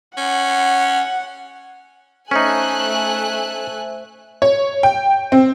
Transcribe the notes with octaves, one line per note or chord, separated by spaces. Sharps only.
C#4 F#5
A3 C#4 D#4 C5 E5 G#5 F#6
C#5
G5
C4